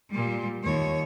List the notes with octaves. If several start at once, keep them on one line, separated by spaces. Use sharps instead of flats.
A#2 G3
D#2 C#5